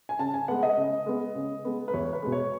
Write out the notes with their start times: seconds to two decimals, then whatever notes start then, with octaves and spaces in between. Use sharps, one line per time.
0.09 G#5
0.19 C#3 A5
0.34 G#5
0.48 G#3 B3 F#5
0.63 D#5
0.77 C#3
1.06 G#3 B3
1.35 C#3
1.65 G#3 B3
1.88 B4
1.94 E2 C#5
2.13 B4
2.23 B2 G#3
2.32 C#5